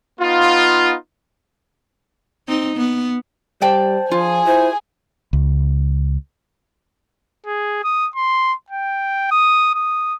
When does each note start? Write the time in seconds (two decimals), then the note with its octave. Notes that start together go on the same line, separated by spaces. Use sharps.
0.20 B3 D#4 F4
2.48 C4 D#4
2.77 B3
3.62 G3 C5 D5 G5 A5
4.11 F3 F4 G#4 G#5
4.47 E4 C5
5.33 C#2
7.46 G#4
7.84 D#6
8.15 C6
8.70 G5
9.31 D#6
9.75 D#6